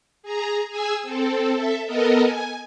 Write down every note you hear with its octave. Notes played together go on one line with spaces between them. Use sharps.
G#4 A#5
G#4 G#5 E6
C4 A4
A4 E5
B3 A4 A#4 D#5
G#5